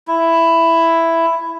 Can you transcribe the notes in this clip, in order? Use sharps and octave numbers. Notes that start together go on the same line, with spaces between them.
E4